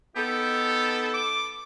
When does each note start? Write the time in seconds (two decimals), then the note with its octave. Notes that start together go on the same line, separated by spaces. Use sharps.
0.16 B3 D#4 G4 A4
1.14 D6